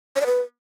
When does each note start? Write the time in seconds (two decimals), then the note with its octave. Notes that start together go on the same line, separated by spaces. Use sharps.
0.16 C#5
0.21 D5
0.26 B4